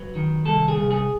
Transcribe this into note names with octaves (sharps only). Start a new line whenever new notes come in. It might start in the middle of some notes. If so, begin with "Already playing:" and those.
Already playing: F#3 B4
D#3
C2 A4
G#4
C2
G#4